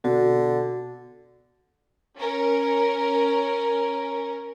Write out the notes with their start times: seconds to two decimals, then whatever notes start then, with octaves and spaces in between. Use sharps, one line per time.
0.04 B2 D3 F#4
2.17 C#4 A#4